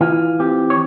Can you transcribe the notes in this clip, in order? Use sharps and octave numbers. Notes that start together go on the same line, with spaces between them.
E3 F4
C4 G4
C#5